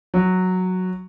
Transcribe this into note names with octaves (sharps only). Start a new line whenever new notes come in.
F#3